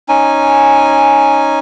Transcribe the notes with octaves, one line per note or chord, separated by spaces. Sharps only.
C#4 D#4 G#5